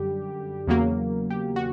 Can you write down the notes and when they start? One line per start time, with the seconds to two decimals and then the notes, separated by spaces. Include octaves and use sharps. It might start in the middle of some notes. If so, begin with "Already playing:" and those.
Already playing: F#2 D3 G3 G4
0.68 E2 C#3 F#3 A#3
1.30 G4
1.56 F#4